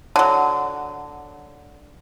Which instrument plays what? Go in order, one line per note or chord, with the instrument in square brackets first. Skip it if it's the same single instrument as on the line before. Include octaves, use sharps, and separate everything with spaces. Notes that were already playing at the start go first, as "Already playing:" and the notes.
[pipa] D3 F#3